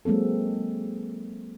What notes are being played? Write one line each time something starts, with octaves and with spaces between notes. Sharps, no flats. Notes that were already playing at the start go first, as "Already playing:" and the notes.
F#3 G#3 A#3 C4 A4